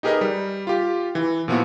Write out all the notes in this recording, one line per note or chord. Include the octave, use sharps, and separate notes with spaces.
D#4 G4 G#4 A#4 B4 D#5
G3
F4 G4
E3
A#2 F3 B3 E4 F#4